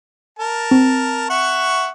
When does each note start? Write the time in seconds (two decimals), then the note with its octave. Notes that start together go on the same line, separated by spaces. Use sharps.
0.39 A#4 A5
0.71 C4
1.30 E5 F#5 C#6